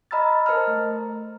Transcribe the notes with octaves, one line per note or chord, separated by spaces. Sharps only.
D#5 A#5 B5 E6 F6 A6
A#4 C5 D#5 A5 A#5 F6
A3